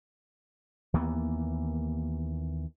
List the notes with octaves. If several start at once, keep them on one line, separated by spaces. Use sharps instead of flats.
D#2 E3 A#3 B3